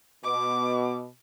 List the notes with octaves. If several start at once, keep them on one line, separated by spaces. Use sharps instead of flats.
B2 D6